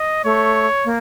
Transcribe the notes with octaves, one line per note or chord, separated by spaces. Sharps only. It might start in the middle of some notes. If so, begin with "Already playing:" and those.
Already playing: D#5
A3 C#5
A#3